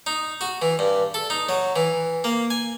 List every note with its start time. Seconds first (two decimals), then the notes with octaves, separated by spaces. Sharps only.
0.07 D#4
0.41 F#4
0.62 E3
0.79 G2
1.14 A4
1.30 D#4
1.49 F#3
1.76 E3
2.24 A#3
2.50 G#5